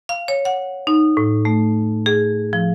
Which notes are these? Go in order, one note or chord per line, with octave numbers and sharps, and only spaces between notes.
F5
C#5
F#5
D#4
A2
A3
G#4
F3